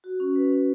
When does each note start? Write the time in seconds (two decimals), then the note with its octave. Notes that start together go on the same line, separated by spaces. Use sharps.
0.04 F#4
0.20 C#4
0.36 B4
0.52 C#4